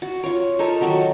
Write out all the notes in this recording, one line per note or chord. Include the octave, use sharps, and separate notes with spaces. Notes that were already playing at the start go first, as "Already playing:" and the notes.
F#4
F4 C#5
D#4 A4 A#4 C#5
D#3 F#3 F#4 A4